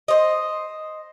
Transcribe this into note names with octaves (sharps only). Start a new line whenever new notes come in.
C5 D#5